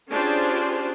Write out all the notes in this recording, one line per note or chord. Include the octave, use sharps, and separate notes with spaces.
C#4 D4 F4 G4 G#4 C5